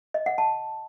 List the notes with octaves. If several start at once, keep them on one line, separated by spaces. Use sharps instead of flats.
D#5
F#5
A5